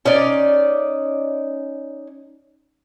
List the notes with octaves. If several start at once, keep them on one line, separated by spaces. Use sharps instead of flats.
C#4 D#4 D5